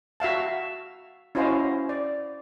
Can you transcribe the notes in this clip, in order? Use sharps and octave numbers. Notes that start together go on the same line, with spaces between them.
F#4 E5 F5 A5
C#4 E4 F#4 C5 D#5 F5
D5